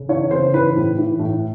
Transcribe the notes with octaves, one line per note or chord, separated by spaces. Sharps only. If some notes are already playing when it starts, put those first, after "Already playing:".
Already playing: C#3
E3 C#5
C#3 C5
E3 B4
A2
E3
A2